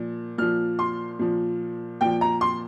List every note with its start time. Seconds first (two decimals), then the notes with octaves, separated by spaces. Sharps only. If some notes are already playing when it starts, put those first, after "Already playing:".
Already playing: A#2 F3
0.38 A#2 F3 F6
0.79 C6
1.19 A#2 F3
2.01 A#2 F3 G5
2.21 A#5
2.41 C6